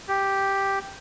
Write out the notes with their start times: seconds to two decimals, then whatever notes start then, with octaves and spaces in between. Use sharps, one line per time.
0.08 G4